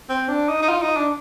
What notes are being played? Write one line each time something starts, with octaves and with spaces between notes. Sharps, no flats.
C4
D4
D#4
D#4
F4
D#4
D4